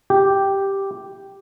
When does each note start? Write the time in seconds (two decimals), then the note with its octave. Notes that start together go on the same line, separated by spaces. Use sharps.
0.10 G4